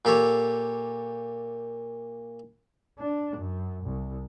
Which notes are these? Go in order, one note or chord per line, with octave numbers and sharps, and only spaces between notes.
A#2 G4 A4 C#5
D4
F#2
C2